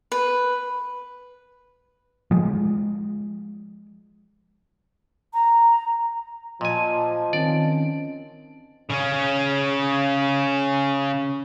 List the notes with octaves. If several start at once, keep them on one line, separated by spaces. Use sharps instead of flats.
B4
F3 G#3
A#5
A#2 F3 D#5 G#5 A5
D#3 C4 C#4 D5
C#3 C#4